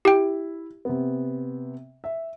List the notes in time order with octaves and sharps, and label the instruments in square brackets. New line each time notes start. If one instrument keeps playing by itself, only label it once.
[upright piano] E4 [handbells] G4 G5
[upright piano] C3 B3
E5